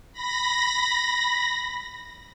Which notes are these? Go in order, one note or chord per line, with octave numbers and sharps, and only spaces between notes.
B5 A#6